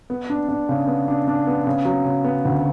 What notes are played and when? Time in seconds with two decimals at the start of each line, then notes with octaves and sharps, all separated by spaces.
0.10 B3
0.30 D4
0.49 D4
0.69 C#3
0.87 B3
1.08 D4
1.28 D4
1.47 B3
1.67 C#3
1.85 F#3
2.05 C#3
2.24 B3
2.45 D2